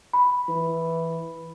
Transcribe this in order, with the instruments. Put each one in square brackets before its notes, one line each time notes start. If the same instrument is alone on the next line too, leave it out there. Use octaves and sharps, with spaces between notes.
[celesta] B5
[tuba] E3